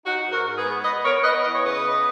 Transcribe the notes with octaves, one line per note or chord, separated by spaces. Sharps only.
D#4 F#4
G#2
F#4 A#4
G#2
G#4 B4
B3
B3 B4 D#5
B3 A#4 C#5
B3 B4 D#5
E3 D#5
C#5
C#3 B4 D#5
B3